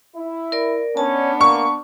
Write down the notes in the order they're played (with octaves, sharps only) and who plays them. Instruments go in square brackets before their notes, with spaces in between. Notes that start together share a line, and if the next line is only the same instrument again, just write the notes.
[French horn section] E4
[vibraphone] A#4 D5
[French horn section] B3 D4 [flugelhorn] C#4 [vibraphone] A5
[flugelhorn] A#3 [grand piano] C#6